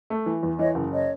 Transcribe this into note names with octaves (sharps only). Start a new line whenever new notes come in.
A3
E3
E2
E3 C#5 D#5
F#1
C#5 D#5